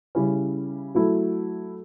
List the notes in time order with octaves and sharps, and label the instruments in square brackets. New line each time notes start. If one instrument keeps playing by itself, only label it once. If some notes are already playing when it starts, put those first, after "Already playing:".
[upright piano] C#3 G3 C#4 E4
F#3 A3 E4